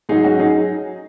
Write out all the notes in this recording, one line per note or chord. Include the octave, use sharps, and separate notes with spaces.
G#2 F#3 D#4 G#4
C#4 F#4
F#3 D#4 G#4